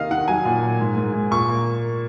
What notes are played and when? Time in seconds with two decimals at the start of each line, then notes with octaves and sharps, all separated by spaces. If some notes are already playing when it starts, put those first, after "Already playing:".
Already playing: C3 D#3 A#3 D#5 F5
0.11 D#3 F#5
0.28 F#3 G#5
0.45 A#2
0.63 A#3
0.80 G#2
0.97 G#2
1.13 G#2
1.31 A#2 C#6
1.48 A#3